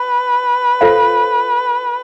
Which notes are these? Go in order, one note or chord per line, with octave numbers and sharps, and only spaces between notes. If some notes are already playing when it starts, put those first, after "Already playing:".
Already playing: B4
F4 A4 C5 F5